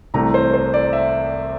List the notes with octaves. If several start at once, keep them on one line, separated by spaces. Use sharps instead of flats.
C2 C3 E3 A3 A#5
C5
C5
D5
E5